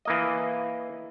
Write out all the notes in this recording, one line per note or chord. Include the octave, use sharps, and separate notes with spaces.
E3 A#3 D#5